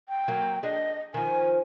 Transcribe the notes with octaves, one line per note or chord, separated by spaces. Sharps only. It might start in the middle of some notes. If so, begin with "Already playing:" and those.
G5
F#3 A#3
D4 G#4 D#5
D#3 F3 G#5